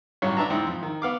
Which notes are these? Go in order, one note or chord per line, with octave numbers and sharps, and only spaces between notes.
A1 G2 F#3 C#5
D4 B4 E5 A5 A#5
E2 G#2 C4
F2
D#3
B3 F5 D6